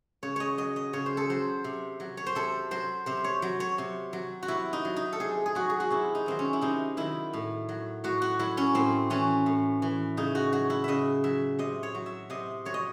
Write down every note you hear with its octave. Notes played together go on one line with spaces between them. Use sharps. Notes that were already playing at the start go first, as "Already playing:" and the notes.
C#3 C#5
C#5 D#5
F#3 D#5
D#5
C#3 C#5
C5
A4
F#3 C5
C3
F#3
C#5
C5
C3 A4
F#3 C5
C3 C5
C#5
F#3
C#5
C3
F#3
F#4
C3 E4
D#4
F#3
D#4
A4
C3 G#4
G#4
F#3 F#4
G#4
F#4
C3 E4
D#4
D#3 F#3 C4
C#4
E4
C3 D#4
D#3 F#3 E4
A2
F#3
A2 F#4
F#4
F#3 E4
C#4
A2 C4
E3 C#4
A2
E3
C#3 D#4
F#4
F#3 F#4
E4
C#3 D#5 E5
F#3 E5
C3 D#5
C#5
F#3
E5
C3 D#5
F#3 C#5
D#5